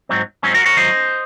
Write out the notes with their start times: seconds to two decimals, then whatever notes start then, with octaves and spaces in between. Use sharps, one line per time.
0.09 G#2 F#3 C4
0.43 G#2 F#3 C4 C#4
0.54 F#4 A#4
0.66 A#4 C#5
0.76 G#2 D#3 F#3 C5 D#5